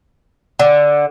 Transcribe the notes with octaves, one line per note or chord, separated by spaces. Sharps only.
D3